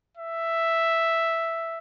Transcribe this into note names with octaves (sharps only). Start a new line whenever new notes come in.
E5